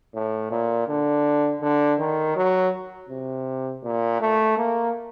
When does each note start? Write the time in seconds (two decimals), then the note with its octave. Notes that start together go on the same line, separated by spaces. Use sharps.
0.14 A2
0.51 A#2
0.88 D3
1.61 D3
1.99 D#3
2.36 F#3
3.09 C3
3.83 A#2
4.21 A3
4.58 A#3